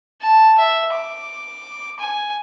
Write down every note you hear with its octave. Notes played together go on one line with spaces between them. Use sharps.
A5
E5
D6
G#5